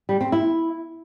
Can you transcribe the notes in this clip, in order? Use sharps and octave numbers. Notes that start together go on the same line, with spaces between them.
G3
C4
E4